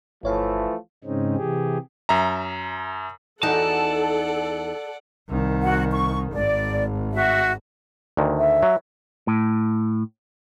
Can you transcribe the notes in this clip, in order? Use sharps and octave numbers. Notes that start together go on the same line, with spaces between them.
G1 E3 F3 A3 C#5 F5
G#2 C#3 G#3 C4 C#4 D#4
C3 E3 G4 G#4
F#2 E5 A#5
E2 D#4 F#4 A4 D5 F#5 A5
C2 D#3
F#4 F#5
C#6
G#1 D5
F#4 E5
D2 D3 D#3
E5
F#3
A2